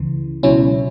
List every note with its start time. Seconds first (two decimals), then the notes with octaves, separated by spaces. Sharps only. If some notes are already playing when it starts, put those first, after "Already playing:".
Already playing: C#2 C#3 E3
0.43 C#2 B2 F#3 C#4 E4